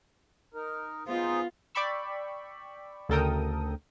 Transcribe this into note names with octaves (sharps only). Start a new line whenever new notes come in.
D#4 A#4
B3 D#4 F4 G#4 C5
D5 G5 B5 C#6 E6
D2 C#3 A4 A#4 G5 D#6